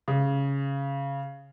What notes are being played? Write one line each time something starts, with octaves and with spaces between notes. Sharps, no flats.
C#3